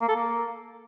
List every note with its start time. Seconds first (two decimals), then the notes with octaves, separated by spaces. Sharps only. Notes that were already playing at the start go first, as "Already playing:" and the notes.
0.01 A#3
0.08 A4
0.15 A#3